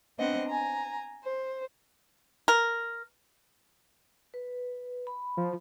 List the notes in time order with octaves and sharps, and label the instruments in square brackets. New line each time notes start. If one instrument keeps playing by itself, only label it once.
[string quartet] B3 C4 D4 C5 D#5 F#5
G#5 A#5
C5
[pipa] A#4
[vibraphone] B4
B5
[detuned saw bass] F3